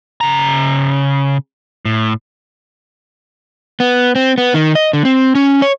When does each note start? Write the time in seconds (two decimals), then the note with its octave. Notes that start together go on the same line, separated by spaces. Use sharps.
0.21 C#3 A#5
1.85 A2
3.80 B3
4.15 C4
4.38 B3
4.54 D#3
4.75 D#5
4.93 D3
5.05 C4
5.35 C#4
5.62 C#5